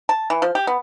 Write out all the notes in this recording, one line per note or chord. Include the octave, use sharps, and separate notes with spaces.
A5
E3
F3
G4
B3